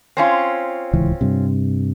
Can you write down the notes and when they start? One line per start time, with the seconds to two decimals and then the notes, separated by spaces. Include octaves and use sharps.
0.17 C4 C#4 F4
0.93 D1 C#2 E3
1.21 G2 C3